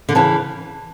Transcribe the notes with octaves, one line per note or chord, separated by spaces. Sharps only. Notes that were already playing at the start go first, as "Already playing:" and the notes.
D3
C#3 E3 A5